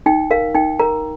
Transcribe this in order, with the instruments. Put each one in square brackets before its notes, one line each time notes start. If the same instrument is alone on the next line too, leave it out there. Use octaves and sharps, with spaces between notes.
[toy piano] D#4 G5
A#4 F5
D#4 G5
A#4 A#5